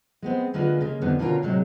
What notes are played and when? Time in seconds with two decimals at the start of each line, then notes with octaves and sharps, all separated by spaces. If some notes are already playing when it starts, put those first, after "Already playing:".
0.22 G#3 B3 C4
0.53 D3 G#3 A#3 F4 F#4 B4
0.81 C#3 G#3 A#3
1.01 F2 D3 G3 B3 D#4
1.19 B2 D3 C#4 F4 G#4 A#4
1.42 A2 C3 F#3 G#3